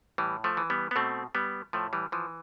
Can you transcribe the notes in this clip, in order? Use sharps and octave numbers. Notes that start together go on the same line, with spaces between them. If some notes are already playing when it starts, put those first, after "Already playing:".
A2 E3 G3
F3 A3
E3
G3 B3
B3
B2 A3 C4
G3 B3
A2 F3 A3
E3 G3
E3 F3